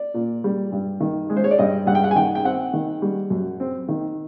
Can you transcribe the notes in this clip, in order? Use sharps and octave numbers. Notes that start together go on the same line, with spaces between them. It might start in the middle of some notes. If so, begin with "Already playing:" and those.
Already playing: D5
A#2
G3
G2
D#3
G#3
C5
C#5
D5
G2 D#5
G2 F#5
G5
F#5
G#5
D#3 G5
G5
C4 F#5
D#3
G3
F#2
C4
D#3